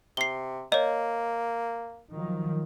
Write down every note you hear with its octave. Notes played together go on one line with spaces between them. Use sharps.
C3 C7 G7
A#3 C#5 D#5
D#3 F3 F#3